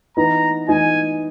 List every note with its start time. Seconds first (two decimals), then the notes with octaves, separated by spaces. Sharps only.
0.17 E3 B3 D#4 A#5
0.68 E3 B3 D#4 G#5